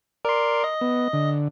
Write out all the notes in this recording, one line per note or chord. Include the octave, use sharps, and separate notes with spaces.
A#4 D5 C6
D#5
B3
D3